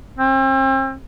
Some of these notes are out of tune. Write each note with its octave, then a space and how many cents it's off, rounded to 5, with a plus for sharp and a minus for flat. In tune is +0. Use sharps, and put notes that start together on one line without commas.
C4 +40